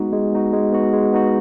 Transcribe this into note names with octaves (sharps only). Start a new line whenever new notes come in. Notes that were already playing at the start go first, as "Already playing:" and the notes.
Already playing: G#3 B3 D#4 F#4
G#3
B3 D#4 F#4
G#3
B3 D#4 F#4
G#3
B3 D#4 F#4